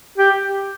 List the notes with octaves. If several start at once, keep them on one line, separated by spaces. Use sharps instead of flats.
G4